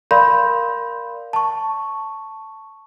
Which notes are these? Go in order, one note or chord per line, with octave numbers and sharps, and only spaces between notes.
A#4 D5 F5 B5 C6 G6
A5 C#6